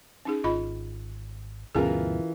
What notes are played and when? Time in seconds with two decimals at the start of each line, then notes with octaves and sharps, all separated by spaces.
0.25 C#4 D#4 G#4
0.44 G#1 F4 D#5 B5
1.75 D2 G2 B2 E3 C#4 F4 G#4 A#4